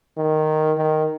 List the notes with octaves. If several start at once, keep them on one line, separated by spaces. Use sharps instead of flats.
D#3
D#3